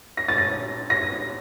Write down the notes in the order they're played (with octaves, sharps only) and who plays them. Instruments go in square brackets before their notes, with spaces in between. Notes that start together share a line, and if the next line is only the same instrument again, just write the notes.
[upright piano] A#6
A6
A#6
A#6